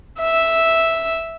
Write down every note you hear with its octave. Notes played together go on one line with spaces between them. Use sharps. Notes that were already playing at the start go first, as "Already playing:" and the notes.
E5